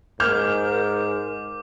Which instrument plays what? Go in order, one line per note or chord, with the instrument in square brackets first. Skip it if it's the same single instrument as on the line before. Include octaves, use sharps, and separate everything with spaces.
[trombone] G#2 [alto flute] A#4 [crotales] D6 [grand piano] F6 G6 F7